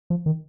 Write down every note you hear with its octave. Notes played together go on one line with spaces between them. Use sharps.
F3
D#3